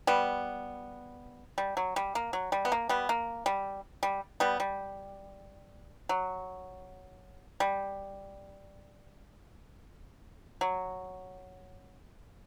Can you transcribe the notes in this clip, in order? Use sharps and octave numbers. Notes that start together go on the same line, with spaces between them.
G3 B3
G3
F#3
G3
A#3
F#3
G3
B3
A#3
G3 B3
A#3
G3
G3
G3 B3
G3
F#3
G3
F#3